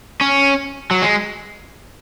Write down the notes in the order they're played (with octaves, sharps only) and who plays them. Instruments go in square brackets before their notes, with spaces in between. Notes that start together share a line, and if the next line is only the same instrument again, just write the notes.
[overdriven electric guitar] C#4
F#3
G#3